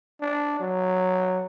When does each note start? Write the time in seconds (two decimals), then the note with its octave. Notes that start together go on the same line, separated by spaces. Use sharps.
0.21 D4
0.60 F#3